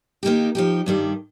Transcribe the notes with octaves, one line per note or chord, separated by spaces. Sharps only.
D#3 A#3 D#4 G4
F3 D#4 G4
G2 D#3 G3